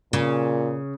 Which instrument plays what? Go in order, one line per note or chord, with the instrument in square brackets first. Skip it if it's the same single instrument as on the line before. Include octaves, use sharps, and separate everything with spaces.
[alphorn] A#2 [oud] C#3